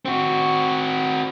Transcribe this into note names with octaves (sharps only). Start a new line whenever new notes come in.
C4 F#4